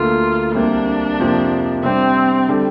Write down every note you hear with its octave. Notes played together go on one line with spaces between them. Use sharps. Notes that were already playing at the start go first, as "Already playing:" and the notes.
Already playing: D2 D3 A#3 F4
C2 C3 A#3 D4
F2 C3 F3 A#3
C3 G3 C4 D4
D3 G3 D4